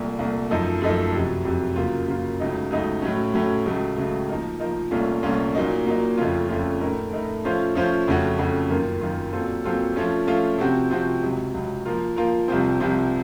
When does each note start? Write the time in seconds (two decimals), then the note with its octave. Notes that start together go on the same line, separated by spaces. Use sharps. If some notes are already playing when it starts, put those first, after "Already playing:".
Already playing: C2 A#2 A3
0.19 C2 A#2 A3
0.50 F#2 F3 A3 D#4 A4
0.82 F#2 F3 A3 D#4 A4
1.13 F2 C3 F#3
1.45 F2 C3 F#3
1.76 F#2 C#3 F#3 A#3 F4
2.07 F#2 C#3 F#3 A#3 F4
2.40 C#2 C#3 F#3 A3 D#4
2.70 C#2 C#3 F#3 A3 D#4
3.02 A2 F#3 A3 C#4
3.34 A2 F#3 A3 C#4
3.66 C#2 C#3 F#3 A3
3.97 C#2 C#3 F#3 A3
4.29 F3 A#3 D#4 A#4
4.60 F3 A#3 D#4 A#4
4.91 C2 A#2 A3 C#4 F4
5.23 C2 A#2 A3 C#4 F4
5.55 A#2 F#3 A#3 D#4
5.86 A#2 F#3 A#3 D#4
6.17 F2 C#3 A3 C#4 F4
6.49 F2 C#3 A3 C#4 F4
6.80 A2 A3 D#4 A#4
7.12 A2 A3 D#4 A#4
7.44 F3 A3 C#4 F4 C5
7.75 F3 A3 C#4 F4 C5
8.07 F2 C#3 A3 C#4 F#4
8.38 F2 C#3 A3 C#4 F#4
8.70 F#2 D#3 A#3 F4
9.01 F#2 D#3 A#3 F4
9.33 A#2 F#3 C4 F4 A4
9.64 A#2 F#3 C4 F4 A4
9.96 F3 A3 C#4 F4
10.27 F3 A3 C#4 F4
10.58 C3 F3 C4 F#4
10.90 C3 F3 C4 F#4
11.22 C#2 C3 F#3
11.54 C#2 C3 F#3
11.85 F3 A#3 F4 A#4
12.16 F3 A#3 F4 A#4
12.48 C2 C3 F3 C4
12.80 C2 C3 F3 C4